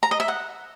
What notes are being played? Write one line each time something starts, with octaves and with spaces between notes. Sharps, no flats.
A#5
D#5
E5
F#5